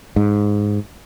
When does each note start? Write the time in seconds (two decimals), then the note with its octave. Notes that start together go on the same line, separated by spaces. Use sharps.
0.16 G#2